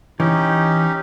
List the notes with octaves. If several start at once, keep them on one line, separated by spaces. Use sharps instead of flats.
E3 C#4 D#4 G4